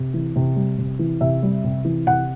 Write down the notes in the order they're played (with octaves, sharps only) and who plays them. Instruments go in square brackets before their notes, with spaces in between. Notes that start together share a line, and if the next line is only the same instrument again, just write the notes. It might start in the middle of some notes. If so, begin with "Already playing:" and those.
Already playing: [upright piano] C3
E3
C3
G3
C3
E3
C3 E5
G3
C3
E3
C3 F#5